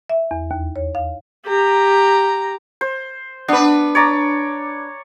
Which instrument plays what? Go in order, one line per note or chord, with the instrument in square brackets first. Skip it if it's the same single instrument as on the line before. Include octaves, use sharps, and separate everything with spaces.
[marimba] E5
E2
D#2
C#5
F5
[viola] G4 A#5
[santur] C5
[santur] B3 [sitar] D4 B4
[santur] C#5 D5 A#5